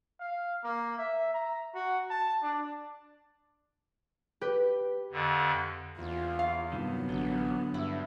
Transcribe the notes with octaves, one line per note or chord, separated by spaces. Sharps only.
F5
A#3
E5
A#5
F#4
A5
D4
G4 B4
F2 D3
E2 F4
F5
G2 C3 D#3 F#3 B3
A1 D3
G2 E4